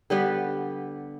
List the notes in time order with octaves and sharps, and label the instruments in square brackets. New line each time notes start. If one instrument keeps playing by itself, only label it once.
[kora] D3 G3 B3 B4